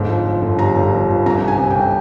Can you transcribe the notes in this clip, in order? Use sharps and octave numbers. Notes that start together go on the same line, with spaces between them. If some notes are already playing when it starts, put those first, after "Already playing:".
Already playing: G1 G#2
F3
F3
G1
G2 A#5
G1
F3
G1
C2 A#5
C3
G#5
C3
G5
C2